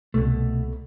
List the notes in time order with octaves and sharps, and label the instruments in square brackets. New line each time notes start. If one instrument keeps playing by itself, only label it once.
[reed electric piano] C2 [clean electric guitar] B2 A3